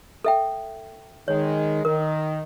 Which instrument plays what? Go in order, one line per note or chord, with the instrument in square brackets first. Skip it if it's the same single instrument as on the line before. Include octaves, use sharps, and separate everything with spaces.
[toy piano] A4 E5 G5
[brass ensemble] D#3 G#3 [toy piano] C#5
[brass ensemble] D#3 [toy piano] A#4